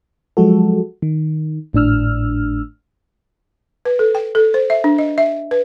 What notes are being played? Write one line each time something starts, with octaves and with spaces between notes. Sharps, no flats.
F3 F#3 G#3 F#4 A4
D#3
G#1 A2 D4 E6 F6
B4
A4
G5
A4
C5
E5
D4
D#5
E5
B4